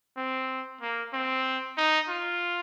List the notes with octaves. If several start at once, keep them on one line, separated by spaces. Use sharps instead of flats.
C4
A#3
C4
D#4
F4